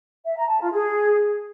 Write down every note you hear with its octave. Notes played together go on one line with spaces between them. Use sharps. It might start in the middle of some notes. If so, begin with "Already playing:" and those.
E5
A#5
A5
F4
G#4